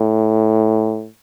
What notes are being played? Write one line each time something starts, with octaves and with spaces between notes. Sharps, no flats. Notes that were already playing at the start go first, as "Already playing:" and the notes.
Already playing: A2